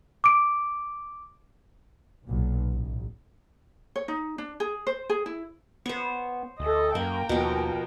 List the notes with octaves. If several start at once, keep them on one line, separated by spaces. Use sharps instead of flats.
D6 D7
B1 A#2
A1
C#5
D#4
D4
G#4
C5
G#4
E4
B3 C5 C#5
D2 A4 D#5
F#2 A#3 A#4 G5
D#2 B2 F3